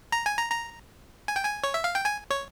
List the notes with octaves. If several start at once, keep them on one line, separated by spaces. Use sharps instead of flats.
A#5
G#5
A#5
A#5
G#5
G5
G#5
C#5
E5
F5
G5
G#5
C#5